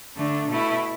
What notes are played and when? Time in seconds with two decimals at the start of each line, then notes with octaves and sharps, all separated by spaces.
0.17 D3 A3 D4
0.49 B2 A3 E4